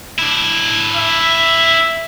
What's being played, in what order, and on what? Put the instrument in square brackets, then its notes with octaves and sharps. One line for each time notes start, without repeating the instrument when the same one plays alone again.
[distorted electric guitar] D4 E4
[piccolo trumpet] E5